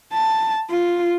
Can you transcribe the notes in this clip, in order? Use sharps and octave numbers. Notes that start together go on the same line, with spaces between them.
A5
F4